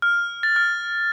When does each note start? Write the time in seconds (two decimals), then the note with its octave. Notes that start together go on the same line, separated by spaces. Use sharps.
0.02 F6
0.43 A6
0.56 F6